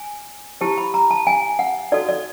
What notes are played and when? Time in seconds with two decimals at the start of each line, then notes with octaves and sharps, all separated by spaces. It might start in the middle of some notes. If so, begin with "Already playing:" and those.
Already playing: G#5
0.61 E4 G4 C5 A5
0.78 B5
0.94 A#5
1.11 A5
1.27 G#5
1.59 F#5
1.92 D#4 F#4 A4 D5
2.09 D5